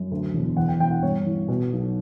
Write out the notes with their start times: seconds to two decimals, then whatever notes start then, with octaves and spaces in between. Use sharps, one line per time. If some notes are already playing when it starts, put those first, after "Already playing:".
Already playing: F#2
0.11 D2
0.34 E1
0.56 E2 F#5
0.68 G5
0.80 E1 G5
0.91 F#5
1.03 G2 C#5
1.26 A1
1.48 B2
1.72 B1